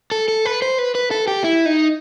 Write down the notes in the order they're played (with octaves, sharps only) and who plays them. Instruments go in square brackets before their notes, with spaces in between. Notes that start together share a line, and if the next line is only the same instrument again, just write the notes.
[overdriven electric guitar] A4
A4
B4
C5
B4
B4
A4
G4
E4
D#4